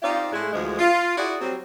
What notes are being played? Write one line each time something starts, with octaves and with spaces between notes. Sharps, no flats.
C4 D#4 F4 G4 D5 F5
A2 G#3 A3 D4 E4 G#4
D2 E3 F3 G#3
F4
E4 F#4 G#4 D5
F#3 G3 C4